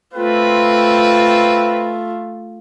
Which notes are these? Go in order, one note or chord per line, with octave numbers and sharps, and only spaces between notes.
A3 C4 F4 B4